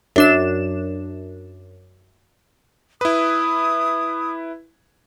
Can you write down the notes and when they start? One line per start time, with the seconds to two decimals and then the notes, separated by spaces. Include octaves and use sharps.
0.16 F#2 D4 E7
3.01 E4 B4 D#6